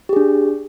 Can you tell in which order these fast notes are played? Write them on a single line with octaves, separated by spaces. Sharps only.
G4 G#4 D4